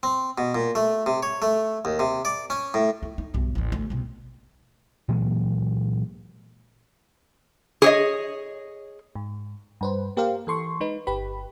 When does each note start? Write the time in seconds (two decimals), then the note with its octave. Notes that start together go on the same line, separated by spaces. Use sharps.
0.03 C4
0.38 B2
0.55 A#2
0.75 A3
1.06 C3
1.23 C#5
1.42 A3
1.85 D#2
2.00 C3
2.25 D5
2.50 C#4
2.74 A2
3.03 E4
3.18 D#4
3.34 B1 G2
3.55 A1 D#2
3.72 D2
3.90 C2 B2
5.08 A#2 E3 F#3 G#3
7.82 G#4 C#5 D#5
9.15 G#2
9.81 G2 B4 C5
10.17 A#3 G4 A#4 C5 F5
10.47 E3 A4 C6 C#6
10.80 G#3 D#4 B4
11.07 G1 G4 B4 B5